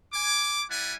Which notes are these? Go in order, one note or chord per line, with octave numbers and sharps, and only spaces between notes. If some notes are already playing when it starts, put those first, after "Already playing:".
G#5 D6
G3 E4 D5 F#5 G#5